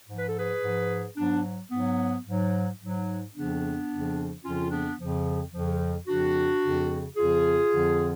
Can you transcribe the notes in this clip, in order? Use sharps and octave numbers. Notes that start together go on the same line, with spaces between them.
G#2 F3
B4
A4
G#4 B4
G#2 F3
G#2 F#3 B3 D4
G#2 F#3 B3
G#2 F#3
G#2 F#3
F2 C#3 F3 B3 D4
F2 C#3 F3
F2 C#3 F3 C#4 F4
B3 D4
F2 C#3 F3
F2 C#3 F3
F2 C#3 F3 D4 F#4
F2 C#3 F3
F2 C#3 F3 F4 G#4
F2 D3 F3